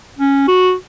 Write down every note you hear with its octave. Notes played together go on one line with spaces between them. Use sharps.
C#4
F#4